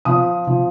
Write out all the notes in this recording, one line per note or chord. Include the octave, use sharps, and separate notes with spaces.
F3 D#6
F3